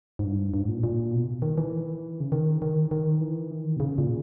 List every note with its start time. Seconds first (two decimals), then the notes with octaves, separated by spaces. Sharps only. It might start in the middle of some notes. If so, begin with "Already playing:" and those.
0.19 G#2
0.24 G2
0.54 G2
0.61 G#2
0.68 A#2
0.84 A#2
1.13 B2
1.42 D#3
1.58 E3
2.20 C#3
2.32 D#3
2.62 D#3
2.91 D#3
3.21 E3
3.51 D#3
3.76 B2
3.80 C#3
3.98 A#2